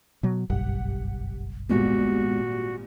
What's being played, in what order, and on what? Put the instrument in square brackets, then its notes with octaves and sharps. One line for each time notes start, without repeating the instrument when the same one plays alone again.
[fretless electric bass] B2 F#3
[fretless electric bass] F#1 B1 G2 [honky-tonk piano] G4 F#5
[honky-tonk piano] G#1 A#2 G3 [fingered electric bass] G#3 B3 [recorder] F#4